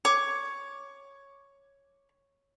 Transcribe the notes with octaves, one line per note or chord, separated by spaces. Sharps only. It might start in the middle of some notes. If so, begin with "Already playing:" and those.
C#5 D6